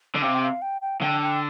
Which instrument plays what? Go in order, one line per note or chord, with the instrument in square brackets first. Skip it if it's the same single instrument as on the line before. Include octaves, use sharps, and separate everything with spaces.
[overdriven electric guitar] D3
[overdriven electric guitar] C3 [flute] F5
[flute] G5
F5
G5
G5
[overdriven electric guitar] D3 [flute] G5
[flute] G5